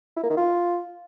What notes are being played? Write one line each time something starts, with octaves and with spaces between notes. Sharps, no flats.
E4
A#3
D#3
F4